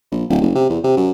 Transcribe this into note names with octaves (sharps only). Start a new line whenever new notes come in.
A#1
D1
F#1
C3
E2
C3
F#2